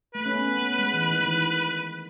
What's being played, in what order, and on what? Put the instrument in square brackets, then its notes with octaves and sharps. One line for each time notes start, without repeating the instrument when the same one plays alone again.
[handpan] A3 [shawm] B4
[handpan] C#4
B3
B3
G#3
E3
D#3
E3